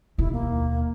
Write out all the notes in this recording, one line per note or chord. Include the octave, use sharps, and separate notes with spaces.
D#2 B2 E4
A#3